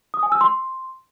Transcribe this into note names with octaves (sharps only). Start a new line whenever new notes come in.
D#6
G#5
E6
C6